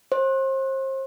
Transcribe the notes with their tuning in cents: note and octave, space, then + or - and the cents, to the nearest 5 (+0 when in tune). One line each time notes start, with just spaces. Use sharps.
C5 +35